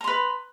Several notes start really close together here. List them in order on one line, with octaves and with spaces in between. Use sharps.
A#5 C6 B4